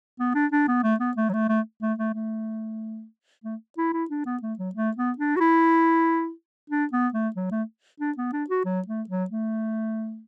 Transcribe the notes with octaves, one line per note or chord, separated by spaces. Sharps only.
B3
D4
D4
B3
A3
B3
A3
F#3
A3
A3
A3
A3
A3
A3
E4
E4
D4
B3
A3
F#3
A3
B3
D4
F#4
E4
D4
B3
A3
F#3
A3
D4
B3
D4
F#4
F#3
A3
F#3
A3